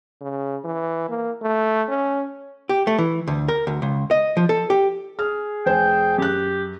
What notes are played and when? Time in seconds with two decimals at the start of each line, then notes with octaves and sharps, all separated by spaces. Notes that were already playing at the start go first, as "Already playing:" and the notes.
0.21 C#3
0.65 E3
1.09 A#3
1.42 A3
1.89 C#4
2.69 G4
2.87 A3
2.98 E3
3.27 D2
3.48 A#4
3.67 D2
3.82 C#2
4.11 D#5
4.37 F3
4.49 A4
4.70 G4
5.19 G#4 F6
5.66 F1 C5 G5 G#5
6.18 F#2 G4 F#6